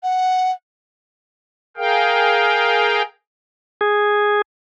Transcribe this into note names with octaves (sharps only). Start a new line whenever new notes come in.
F#5
G#4 A#4 F5 G5
G#4